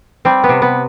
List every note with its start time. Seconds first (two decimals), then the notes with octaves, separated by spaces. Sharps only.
0.25 G3 C4
0.44 B3
0.49 C3
0.62 B3